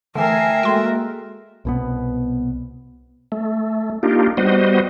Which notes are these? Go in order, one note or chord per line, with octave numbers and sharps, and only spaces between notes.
D3 E3 A3 A#4 E5 G5 G#5 C7
G#3 A#3 F#4 A4 G5 C6
C2 B2 B3
A3
A#3 D4 D#4 F4 G4
G3 B3 F#4 C5 D#5